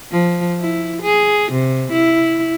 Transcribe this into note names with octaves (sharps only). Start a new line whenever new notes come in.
F3
E4
G#4
C3
E4